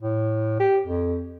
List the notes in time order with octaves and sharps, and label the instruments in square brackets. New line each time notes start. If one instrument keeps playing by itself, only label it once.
[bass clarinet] A2
G4
F2